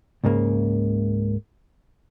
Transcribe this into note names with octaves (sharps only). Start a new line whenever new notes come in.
C#2 G#2 C#3 A#3